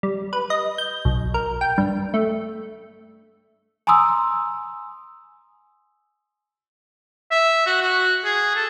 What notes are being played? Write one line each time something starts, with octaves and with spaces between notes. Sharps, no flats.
G3
B4
D#5
G6
B1
A#4
G5
G2
A3
G#5 A#5 C6 D#6 E6
E5
F#4
F#4
G#4
A4